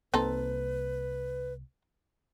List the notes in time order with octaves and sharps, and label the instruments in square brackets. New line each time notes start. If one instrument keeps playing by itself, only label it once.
[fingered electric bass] C2 A#3 [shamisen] C4 D#4 A4 [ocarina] B4